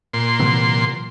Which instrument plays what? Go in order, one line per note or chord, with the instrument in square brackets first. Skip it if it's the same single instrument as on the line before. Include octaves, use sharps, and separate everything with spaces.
[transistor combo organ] A#2 C6
[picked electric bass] C3 E3 F#3